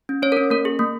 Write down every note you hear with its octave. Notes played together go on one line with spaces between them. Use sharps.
C#4
C#4 C#5
A#4
C#4
A#3 A#4
G#4
A#3